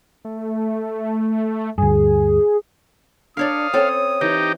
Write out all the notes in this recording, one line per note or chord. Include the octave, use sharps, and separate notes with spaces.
A3
D2 G2 G#4
D4 A#4 C#5 D5 F5 D#6
C4 C#4 A4 C#5
E3 D#4 G4